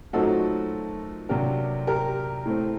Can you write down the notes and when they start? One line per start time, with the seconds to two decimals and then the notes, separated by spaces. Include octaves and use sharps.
0.13 A#2 F#3 A3 C4 D#4 F#4 A4
1.29 C3 F#3 A#3 D4 G4 A#4
1.87 G4 A#4
2.45 A2 A3 C4